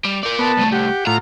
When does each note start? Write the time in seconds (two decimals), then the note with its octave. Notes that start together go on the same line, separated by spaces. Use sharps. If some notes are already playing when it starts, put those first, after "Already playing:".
0.05 G3 F7
0.23 A#4 D5 G6
0.39 B3 A5
0.58 C2 A3
0.72 G4 F#5
1.07 A2 F4 A#5